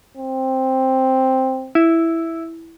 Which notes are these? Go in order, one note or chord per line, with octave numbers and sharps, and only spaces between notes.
C4
E4